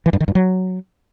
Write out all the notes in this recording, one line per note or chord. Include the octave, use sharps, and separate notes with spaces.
E3
G2
D#3
G2
F#3